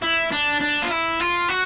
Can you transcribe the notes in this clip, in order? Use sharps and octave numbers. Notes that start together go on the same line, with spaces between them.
E4
D4
D4
F4
E4
F4
F#4